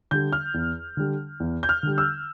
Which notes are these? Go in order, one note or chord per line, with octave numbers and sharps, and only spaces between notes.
D3 G3 G6
F6
E2
D3 G3
E2
G6
F6
D3 G3
E6